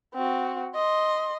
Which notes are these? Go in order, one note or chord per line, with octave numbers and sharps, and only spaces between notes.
C4 F#4
D#5 C6